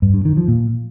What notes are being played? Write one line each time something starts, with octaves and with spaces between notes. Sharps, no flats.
G2
G2
D#3
F3
A#2